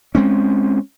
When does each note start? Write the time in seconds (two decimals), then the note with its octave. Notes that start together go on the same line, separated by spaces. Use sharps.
0.15 G#3 C4 C#4